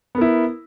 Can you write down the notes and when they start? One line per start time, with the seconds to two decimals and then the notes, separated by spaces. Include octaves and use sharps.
0.15 B3
0.18 A#4
0.21 E4